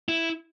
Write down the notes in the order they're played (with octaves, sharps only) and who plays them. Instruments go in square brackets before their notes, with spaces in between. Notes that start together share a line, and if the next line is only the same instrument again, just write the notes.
[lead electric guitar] E4